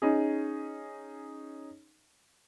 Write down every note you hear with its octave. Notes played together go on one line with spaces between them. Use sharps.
C#4 D#4 G#4